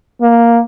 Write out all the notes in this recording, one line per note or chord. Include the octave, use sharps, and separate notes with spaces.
A#3